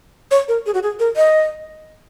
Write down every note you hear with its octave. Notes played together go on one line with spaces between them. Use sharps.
C#5
A#4
G#4
F#4
G#4
A#4
D#5